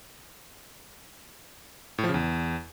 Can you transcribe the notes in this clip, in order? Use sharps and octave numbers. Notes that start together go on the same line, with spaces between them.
A2
F3
C#3
E2